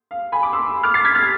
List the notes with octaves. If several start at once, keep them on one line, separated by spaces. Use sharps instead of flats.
F5
G#5 B5
B5 D6
C6 E6
D6 F6
A6 C7
G#6 B6
F6 A6